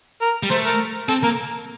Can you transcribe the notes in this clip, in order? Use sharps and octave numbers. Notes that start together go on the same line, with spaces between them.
A#4
G3
A3 C5
A#4
C4 A4
A#3 A#4